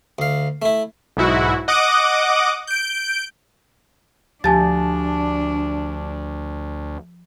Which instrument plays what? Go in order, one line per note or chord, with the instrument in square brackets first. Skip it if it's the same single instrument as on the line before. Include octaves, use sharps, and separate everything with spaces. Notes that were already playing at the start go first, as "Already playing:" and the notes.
[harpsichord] D2 F5
A3 E4
[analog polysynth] B1 G#2 E4 F#4
D#5 F#5 D6 D#6
G6 D7
[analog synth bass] D2 [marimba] F3 G4 [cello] D4 [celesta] G#5 A5 A6